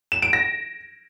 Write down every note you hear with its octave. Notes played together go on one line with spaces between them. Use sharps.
E7
D7
A#6